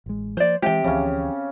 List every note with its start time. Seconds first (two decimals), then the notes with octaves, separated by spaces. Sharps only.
0.06 A1 G#3
0.37 F3 A#3 C5 D5
0.62 C3 E3 G#3 G4 G5
0.84 D2 C#3 E3 F3 C#4